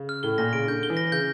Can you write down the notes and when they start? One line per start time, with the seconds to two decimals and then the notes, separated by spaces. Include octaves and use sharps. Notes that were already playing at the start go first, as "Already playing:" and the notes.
Already playing: C#3
0.09 F6
0.23 A2 G7
0.38 A#2 A#6
0.53 C#3 D7
0.68 D3 G6
0.83 G7
0.90 E3
0.97 A#6
1.12 C#3 G6